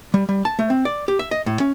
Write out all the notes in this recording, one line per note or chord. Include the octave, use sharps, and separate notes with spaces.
G3
G3
A5
A3
C4
D5
G4
E5
D#5
A2
C#4